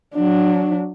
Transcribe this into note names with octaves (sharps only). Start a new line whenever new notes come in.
F#3 D4